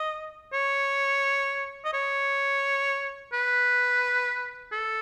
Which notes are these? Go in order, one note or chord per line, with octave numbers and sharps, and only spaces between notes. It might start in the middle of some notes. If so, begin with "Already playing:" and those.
Already playing: D#5
C#5
D#5
C#5
B4
A4